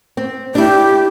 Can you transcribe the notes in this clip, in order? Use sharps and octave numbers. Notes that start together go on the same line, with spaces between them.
C4
D4 E4 G4